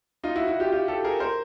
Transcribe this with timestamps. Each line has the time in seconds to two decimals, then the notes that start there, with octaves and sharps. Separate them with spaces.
0.24 D#4 F4
0.35 E4 F#4
0.48 E4 F#4
0.60 F4 G4
0.72 F4 G4
0.88 G4 A4
1.04 G#4 A#4
1.20 A#4 C5